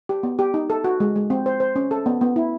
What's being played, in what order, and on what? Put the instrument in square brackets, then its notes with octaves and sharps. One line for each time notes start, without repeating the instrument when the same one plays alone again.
[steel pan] G4
B3
G4
D#4
A4
F#4
G#3
G#3
C4
C5
C5
C#4
A4
B3
B3
E4